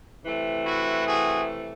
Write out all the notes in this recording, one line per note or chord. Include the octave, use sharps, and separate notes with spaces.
C3 E3 A3
E4 F#4
F#4 G#4